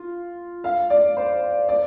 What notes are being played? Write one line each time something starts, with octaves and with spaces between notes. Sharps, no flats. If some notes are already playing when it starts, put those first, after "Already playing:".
Already playing: F4
F5
D5
C5
D5